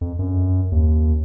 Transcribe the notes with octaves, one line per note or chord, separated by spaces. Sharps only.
F2
F#2
D#2